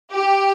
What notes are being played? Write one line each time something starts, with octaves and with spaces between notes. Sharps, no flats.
G4